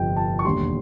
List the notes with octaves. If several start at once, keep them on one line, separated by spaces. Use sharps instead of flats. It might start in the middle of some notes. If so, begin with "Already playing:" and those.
Already playing: G1 F2 C3 G5
A5
C#6
E1 D#2 D3 G3 C6